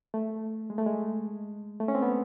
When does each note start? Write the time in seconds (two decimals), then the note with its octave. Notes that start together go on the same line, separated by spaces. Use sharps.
0.14 A3
0.70 G#3
0.78 A3
0.86 G#3
1.80 A3
1.88 C#4
1.95 C4
2.02 B3